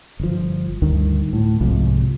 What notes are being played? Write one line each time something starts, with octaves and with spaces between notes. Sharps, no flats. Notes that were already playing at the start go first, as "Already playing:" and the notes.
G1 F3
D2 G2 D#3
A2
C2 G#2 C3 F3